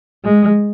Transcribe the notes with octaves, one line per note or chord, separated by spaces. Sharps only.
G#3